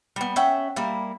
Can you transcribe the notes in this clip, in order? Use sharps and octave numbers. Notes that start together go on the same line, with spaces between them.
G3 B3
C#4 E5 F#5 G5
G3 A#3 E4